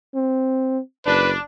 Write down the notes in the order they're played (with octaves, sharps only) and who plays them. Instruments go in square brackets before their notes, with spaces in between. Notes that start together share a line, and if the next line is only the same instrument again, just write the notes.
[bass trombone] C4
[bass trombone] F#1 [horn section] D4 [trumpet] B4